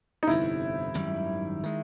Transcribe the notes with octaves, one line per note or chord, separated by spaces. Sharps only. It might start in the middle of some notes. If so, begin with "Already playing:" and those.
D#4
G1 F2 C3 E4
G#1 F#2 D#3 G3
D#3 G#3